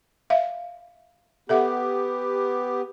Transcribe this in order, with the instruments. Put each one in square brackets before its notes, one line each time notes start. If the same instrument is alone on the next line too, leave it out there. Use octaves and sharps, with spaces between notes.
[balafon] E5 F5
[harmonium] B3 G4 [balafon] A4 E5 F#5